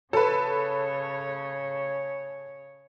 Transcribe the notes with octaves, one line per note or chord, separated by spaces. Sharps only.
C#3 A4 B4 C#5